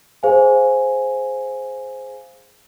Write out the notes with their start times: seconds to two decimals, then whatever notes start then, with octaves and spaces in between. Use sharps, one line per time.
0.23 G#4 C5 F5 G#5